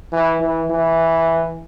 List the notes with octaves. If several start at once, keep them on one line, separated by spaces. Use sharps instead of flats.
E3
E3
E3